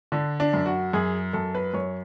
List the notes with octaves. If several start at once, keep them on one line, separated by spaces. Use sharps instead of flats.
D3 D4
D4
F#2
F#4
F#2 G#4
F#2 A4
B4
F#2 C#5